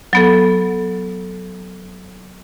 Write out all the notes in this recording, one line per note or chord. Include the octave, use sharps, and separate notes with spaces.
F#3 B3 A4